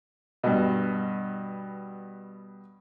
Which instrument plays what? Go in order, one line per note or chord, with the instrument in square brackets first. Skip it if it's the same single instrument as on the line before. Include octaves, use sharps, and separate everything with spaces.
[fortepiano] G2 B2